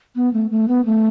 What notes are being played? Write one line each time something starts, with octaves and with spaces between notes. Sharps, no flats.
B3
A3
A3
B3
A3